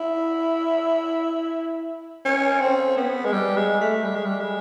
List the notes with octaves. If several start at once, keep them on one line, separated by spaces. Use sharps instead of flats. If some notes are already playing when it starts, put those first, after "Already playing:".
Already playing: E4
C#4
C4
B3
G#3
G3
G#3
A3
G3
G#3
G3
G#3